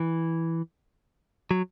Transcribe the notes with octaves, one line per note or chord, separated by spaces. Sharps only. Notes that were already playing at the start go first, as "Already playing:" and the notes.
Already playing: E3
F#3